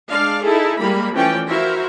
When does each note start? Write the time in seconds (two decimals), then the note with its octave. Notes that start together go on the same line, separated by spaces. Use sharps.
0.10 G#3 D4 D5 F5
0.43 D#4 E4 G#4 A4
0.79 G3 G#3 A#3 B5
1.13 E3 F3 A3 C#4 D5 G5
1.47 E4 F#4 A#4 C5 E5 F5